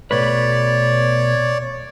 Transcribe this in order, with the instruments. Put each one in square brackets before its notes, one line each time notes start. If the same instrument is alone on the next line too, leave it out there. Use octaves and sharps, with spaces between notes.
[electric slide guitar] B2 A3 B4 [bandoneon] C#5 D5